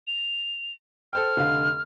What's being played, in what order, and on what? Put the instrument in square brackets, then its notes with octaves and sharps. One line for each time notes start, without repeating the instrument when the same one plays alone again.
[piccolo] F7
[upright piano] A4 C5 G5 [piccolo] F6
[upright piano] F1 D3 F5